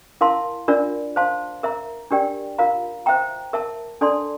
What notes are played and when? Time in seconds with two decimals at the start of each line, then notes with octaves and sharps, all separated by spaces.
0.21 E4 A#4 F5 A5 C6
0.68 D4 F4 A#4 D5
1.16 C5 F5 A5 C6
1.63 A#4 E5 A#5
2.11 D4 G4 A#4 D5 G5
2.58 F4 A#4 F5 A#5
3.06 C5 E5 G5 A#5
3.53 A#4 E5 A5
4.01 D4 A4 D5 A5 C6